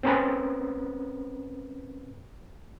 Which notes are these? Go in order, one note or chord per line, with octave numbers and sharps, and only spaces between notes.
C4 C#4 A#4 B4